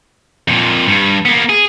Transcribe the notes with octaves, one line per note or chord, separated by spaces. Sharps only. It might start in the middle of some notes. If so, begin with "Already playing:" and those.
F2 A#2
G2
A#3 B3
G#4